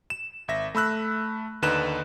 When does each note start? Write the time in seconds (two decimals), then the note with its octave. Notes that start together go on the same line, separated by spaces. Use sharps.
0.10 E7
0.48 G#1 E5 A#6
0.75 A3 B5 E6 F#6
1.62 D#2 D3 D#4 B4 F#6 E7